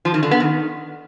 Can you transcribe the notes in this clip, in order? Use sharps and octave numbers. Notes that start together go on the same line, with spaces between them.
F3
D#3
D3
B3
D#3